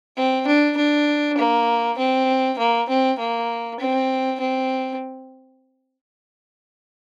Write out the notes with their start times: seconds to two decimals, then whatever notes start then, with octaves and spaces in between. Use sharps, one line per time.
0.17 C4
0.47 D4
0.77 D4
1.38 A#3
1.98 C4
2.58 A#3
2.89 C4
3.19 A#3
3.80 C4
4.40 C4